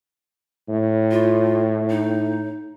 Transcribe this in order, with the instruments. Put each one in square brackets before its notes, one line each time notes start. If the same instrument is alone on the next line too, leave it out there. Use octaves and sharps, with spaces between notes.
[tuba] A2
[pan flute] F4
D#4